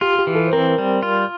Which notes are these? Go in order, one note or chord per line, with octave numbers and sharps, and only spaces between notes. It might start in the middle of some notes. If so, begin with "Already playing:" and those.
F4 G4
G4
E3
A4
C5
C4 A#4
G3
F4